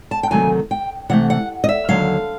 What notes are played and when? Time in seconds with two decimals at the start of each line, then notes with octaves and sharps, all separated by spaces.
0.11 A5
0.23 G5
0.30 D2 C3 D#3 F#3 A3 G#5
0.71 G5
1.09 C3 E3 A3 F#5
1.30 F#5
1.64 D#5
1.69 E5
1.88 D#2 D3 F#3 F5